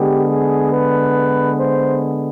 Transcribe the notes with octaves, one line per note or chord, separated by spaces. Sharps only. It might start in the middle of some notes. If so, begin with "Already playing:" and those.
Already playing: D3 G#3 B3 G4
G#4
B4
C5